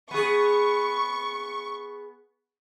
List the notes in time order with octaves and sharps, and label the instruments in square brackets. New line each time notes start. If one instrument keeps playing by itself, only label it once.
[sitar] B3 G#4 [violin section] C#6